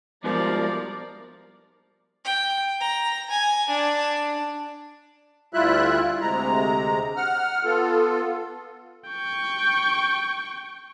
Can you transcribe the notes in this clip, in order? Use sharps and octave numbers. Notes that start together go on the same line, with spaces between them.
G#2 B2 F3 G3 A#4 D5
G5
A#5
G#5
D4
D2 G3 E4 F4 E5 F#6
D2 C3 G#3 A#5
F#5 F6
B3 F4 A4
G5 C#6